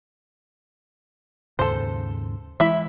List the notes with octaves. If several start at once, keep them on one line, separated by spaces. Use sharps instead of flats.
D#2 G#2 C#3 A4 C5
E3 G#3 E4 E5